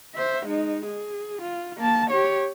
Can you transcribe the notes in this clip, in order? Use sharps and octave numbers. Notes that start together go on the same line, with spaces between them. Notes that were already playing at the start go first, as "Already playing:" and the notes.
C5 E5
G#3 D#4
G#4
F4
A#3 A5
G4 C#5